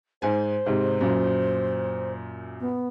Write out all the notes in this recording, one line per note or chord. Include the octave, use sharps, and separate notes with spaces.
G#2 C5 G#5
G#2 C3
F#2 A#2
B3